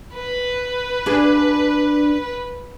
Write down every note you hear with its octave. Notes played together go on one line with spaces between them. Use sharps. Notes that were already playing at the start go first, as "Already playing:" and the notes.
B4
D4 F4 G#4